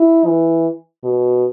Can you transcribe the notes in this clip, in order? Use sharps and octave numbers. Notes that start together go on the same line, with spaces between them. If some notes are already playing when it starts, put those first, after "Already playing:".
Already playing: E4
E3
B2